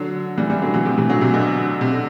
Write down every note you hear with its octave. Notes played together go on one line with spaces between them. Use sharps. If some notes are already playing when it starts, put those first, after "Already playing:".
Already playing: D3 F#3
E3 G3
E3 G3
D3 F#3
C3 E3
A2 C3
C3 E3
D3 F#3
C3 E3
B2 D3
C3
D3